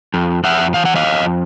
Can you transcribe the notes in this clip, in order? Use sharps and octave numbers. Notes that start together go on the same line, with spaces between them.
F2
F2 E5 F#5
E3 F5
F#5
D#5 F5
F2